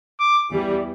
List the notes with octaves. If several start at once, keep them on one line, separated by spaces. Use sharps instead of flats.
D6
E2 E3 G3